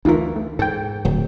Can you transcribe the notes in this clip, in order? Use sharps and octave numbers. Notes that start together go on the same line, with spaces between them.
D2 E3 D#4 F4 A#4
A3
G#2 A4 G5
D1 F#3